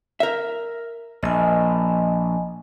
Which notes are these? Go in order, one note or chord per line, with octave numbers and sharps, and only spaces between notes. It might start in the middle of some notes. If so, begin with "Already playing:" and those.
A#4 E5
A#1 D#5 G#5